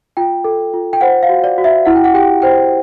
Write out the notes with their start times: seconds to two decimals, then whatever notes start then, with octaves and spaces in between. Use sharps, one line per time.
0.17 F4 G5
0.44 A4
0.74 F4
0.93 G5
1.01 C5 F#5
1.23 F5
1.29 F#4
1.44 D5
1.58 F#4
1.64 E5
1.85 E4 F#5
1.96 G5
2.04 F#5
2.14 G4 G5
2.42 C5 G5